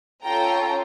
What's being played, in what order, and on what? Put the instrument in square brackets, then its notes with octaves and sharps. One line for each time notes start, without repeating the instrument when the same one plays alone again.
[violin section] C#4 F4 A4 G5 A#5